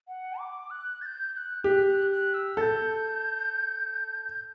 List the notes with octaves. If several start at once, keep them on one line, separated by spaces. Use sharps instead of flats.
F#5
D6
F#6
A6
G6
G6
F#6
G4 F#6
F#6
F#6
E6
A4 G6 A6